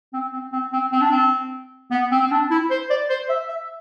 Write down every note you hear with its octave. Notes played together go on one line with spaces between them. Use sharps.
C4
C4
C4
C4
C4
D4
C4
B3
C4
C4
D4
E4
C5
D5
C5
E5
E5